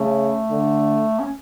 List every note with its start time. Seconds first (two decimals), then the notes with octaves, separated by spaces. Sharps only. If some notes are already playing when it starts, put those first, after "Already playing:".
Already playing: C#3 A3
0.51 D3
1.19 C#4